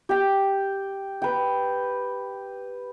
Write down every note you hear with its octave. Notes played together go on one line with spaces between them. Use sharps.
G4 G5
B4 G5